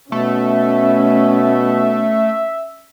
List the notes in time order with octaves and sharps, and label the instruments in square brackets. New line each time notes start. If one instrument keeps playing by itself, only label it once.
[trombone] B2 [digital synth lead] A3 [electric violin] C#4 [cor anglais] E5